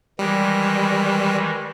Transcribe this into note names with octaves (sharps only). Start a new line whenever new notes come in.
D#3 E3 G3 G#3